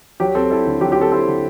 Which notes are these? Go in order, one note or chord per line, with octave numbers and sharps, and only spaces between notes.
F#3 G4
C4 A4
E4 A4
D3
F#3 G4
G4
C4 A4
E4 A4 C5
D3